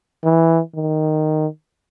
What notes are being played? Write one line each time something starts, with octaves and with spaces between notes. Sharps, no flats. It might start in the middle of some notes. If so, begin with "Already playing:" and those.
E3
D#3